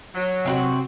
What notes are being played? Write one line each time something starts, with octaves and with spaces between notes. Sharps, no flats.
F#3
C3 C4 E4 F#4